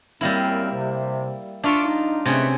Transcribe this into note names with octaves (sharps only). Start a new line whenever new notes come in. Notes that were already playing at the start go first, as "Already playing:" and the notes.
F#2 G3 A#3 C4 E4 F5
C3
D4 F4 E5 C#6 D6
D#4
C3 G#3 A3 C#4 G#4 B4